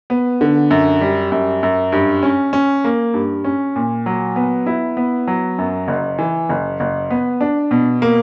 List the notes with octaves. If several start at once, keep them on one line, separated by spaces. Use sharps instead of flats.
B3
D3
F#2
G3
F#2
F#2
G2
C#4
C#4
A#3
G2
C#4
A#2
F#3
B3
E4
B3
F#3
F#2
F#1
E3
F#1
F#1
B3
D4
B2
A#3